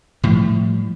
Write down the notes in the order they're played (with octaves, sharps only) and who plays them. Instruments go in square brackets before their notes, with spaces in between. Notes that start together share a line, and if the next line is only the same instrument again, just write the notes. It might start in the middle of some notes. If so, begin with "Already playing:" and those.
[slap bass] A2 F3 G3